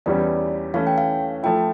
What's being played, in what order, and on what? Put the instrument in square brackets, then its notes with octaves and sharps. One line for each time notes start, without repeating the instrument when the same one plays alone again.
[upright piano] E2 E3 G3 C#4 G4 [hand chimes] D5
[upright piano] E3 A3 C#4 [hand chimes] F5
[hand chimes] G5
F5
[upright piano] F3 A3 E4 [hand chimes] G5